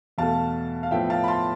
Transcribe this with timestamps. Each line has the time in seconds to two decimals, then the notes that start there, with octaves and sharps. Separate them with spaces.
0.18 E2 B2 A3 F5 A5
0.83 F5
0.91 A2 F3 B3 E5 G5
1.10 F5 A5
1.24 B5
1.28 A5 C6